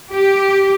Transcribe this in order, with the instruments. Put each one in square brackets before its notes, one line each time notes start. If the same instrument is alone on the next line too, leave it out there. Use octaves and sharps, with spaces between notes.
[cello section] G4